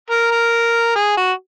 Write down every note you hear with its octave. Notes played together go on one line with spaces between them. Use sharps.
A#4
A#4
G#4
F#4